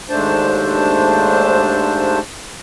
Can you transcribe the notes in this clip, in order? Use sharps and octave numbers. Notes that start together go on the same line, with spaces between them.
D#2 G#2 A3 D4 C5 A5